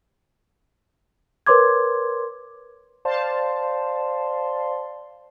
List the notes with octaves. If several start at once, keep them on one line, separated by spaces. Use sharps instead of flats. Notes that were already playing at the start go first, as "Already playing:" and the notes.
A#4 B4 C#5 C6 D6 G#6
C5 D5 F5 A5 C6